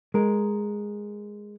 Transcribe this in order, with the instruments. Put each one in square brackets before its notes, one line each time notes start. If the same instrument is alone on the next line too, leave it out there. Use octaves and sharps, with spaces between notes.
[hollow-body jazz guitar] G#3 A#4